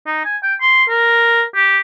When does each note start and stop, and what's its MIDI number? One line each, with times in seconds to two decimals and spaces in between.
0.06 0.22 63
0.25 0.37 80
0.43 0.54 79
0.61 0.84 84
0.89 1.43 70
1.55 1.80 67